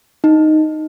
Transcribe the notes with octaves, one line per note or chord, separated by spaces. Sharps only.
D#4